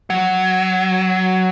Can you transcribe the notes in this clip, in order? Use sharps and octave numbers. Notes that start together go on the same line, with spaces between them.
F#3